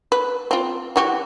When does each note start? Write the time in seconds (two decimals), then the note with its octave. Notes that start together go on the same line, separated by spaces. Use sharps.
0.12 B4
0.51 C4 F4
0.96 E3 F#4 G4